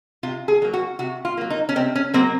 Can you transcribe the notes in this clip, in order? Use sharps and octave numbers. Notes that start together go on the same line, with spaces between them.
C3 F4
G#4
F#3 A#3
F#4
C3 F#4
F4
F#3 A#3
D#4
C#4
C3 C4
C#4
F#3 A#3 C4